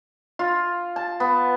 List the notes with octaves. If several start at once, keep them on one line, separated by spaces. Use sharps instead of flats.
F4
A5
B3